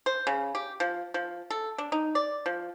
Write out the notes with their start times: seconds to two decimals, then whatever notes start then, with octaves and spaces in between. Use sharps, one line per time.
0.06 C5
0.27 C#3
0.55 G4
0.80 F3
1.14 F3
1.50 A4
1.78 D4
1.92 D#4
2.15 D5
2.46 F3